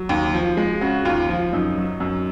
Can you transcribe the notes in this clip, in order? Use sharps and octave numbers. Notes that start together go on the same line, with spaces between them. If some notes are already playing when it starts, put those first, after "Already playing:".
Already playing: F#3
D#2
F3
G#3
C#3 F#4
D#2 F4
F3
F#2 D#4
F#3
F#2